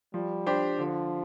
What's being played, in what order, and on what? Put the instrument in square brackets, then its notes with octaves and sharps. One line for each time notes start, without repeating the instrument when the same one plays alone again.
[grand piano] F3 [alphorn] G3
[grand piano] D4 G4 C5
[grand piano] D3 [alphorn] F3